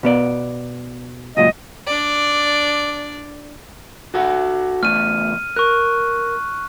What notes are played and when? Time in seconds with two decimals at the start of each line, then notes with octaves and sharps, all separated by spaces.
0.03 B2 B3 D5
1.37 C#2 F#2 A#2 D#5
1.87 D4 D5
4.14 F#4 A4 F#5
4.83 E2 A3 F6 D#7
5.56 A#4 C#6 F#6